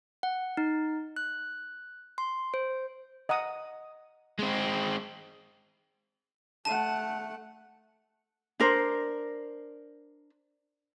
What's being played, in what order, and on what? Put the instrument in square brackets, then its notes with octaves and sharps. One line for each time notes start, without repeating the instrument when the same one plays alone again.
[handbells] F#5
D#4
F#6
C6
C5
[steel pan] D#5 F#5 A#5 D#6
[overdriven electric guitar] G#3 C4
[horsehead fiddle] A3 F#5 [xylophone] A5 D#7
[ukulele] D4 A#4 C5